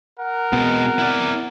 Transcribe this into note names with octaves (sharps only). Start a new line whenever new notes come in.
A#4 F#5
B2 G#3 B3 C4
E4 D5